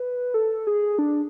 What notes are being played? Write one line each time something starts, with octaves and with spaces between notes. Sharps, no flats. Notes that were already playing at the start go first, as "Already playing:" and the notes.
Already playing: B4
A4
G#4
D4